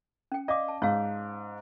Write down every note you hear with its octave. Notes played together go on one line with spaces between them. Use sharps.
C#4 G5
D5 D#5 F5 D6
A5
G#2 C#5 F5